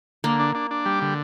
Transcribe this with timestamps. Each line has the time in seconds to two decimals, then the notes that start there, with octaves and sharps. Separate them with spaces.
0.24 D3 A#3
0.39 D4
0.55 D4
0.71 D4
0.85 G3
1.02 D3